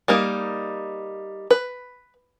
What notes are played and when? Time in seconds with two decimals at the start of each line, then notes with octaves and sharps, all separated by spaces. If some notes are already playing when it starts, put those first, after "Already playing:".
0.08 G3 A#3 D#4
1.51 B4